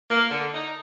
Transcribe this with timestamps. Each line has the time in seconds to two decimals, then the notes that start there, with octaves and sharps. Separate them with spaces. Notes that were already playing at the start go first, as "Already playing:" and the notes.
0.10 A#3
0.30 D3
0.54 D#4